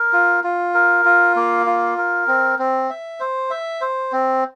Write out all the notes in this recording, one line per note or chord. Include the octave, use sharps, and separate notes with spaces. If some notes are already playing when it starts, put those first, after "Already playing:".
Already playing: A#4
F4
F4
A#4
F4
A#3
F4
A#4
C4
C4
E5
C5
E5
C5
C4